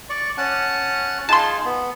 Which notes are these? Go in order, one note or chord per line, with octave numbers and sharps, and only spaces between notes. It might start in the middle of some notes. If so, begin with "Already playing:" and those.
D5 C#6
C#4 F#5 A5
D#4 F4 G#4 A5 C6
B3